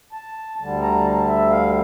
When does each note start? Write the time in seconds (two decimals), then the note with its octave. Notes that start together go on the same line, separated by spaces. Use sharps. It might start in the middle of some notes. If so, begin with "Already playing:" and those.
0.12 A5
0.58 D2 D3 G3 A5
0.82 A#5
1.04 A5
1.27 E5
1.50 F5